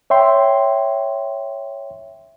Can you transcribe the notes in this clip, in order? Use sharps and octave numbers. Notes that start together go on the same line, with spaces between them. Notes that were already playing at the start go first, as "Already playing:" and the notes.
C#5 E5 G5 C6